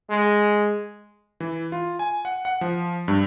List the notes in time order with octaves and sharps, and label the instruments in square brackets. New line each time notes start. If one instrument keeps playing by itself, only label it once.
[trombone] G#3
[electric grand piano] E3
F4
G#5
F#5
F#5
F3
G2